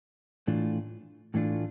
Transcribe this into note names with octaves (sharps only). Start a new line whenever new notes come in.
A2 E3 A3 D4 F4
A2 E3 A3 D4 F4